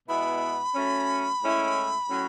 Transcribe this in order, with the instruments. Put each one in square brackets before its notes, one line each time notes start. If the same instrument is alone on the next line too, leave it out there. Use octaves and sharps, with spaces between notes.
[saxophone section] B2 G#3 B3 E4 [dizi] B5
[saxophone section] F#3 A3 C#4
A2 G#3 C#4 E4
A2 F#3 C#4